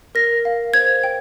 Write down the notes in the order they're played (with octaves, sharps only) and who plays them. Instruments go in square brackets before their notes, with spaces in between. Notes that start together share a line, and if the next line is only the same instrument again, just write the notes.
[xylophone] A#4 A#6
F5
C5 G#6
G5